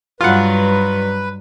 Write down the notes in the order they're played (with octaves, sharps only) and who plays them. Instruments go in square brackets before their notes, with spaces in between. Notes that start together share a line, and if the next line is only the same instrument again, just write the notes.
[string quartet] G2 F#3 [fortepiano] F4 F#5 [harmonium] B4